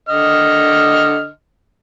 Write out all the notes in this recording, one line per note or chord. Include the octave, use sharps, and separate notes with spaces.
D3 D#5 F6